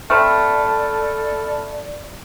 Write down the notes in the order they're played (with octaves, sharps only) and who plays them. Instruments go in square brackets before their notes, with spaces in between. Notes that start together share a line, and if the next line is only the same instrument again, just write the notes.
[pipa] A3 C4 [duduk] A4 [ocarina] D5 [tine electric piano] A5 B5 F6